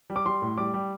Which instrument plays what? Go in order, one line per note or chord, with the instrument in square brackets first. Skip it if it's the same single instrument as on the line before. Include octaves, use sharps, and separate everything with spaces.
[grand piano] G3
D6
G3 C6
A2
G3 D6
G3